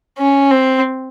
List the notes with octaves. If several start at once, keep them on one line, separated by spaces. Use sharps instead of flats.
C#4
C4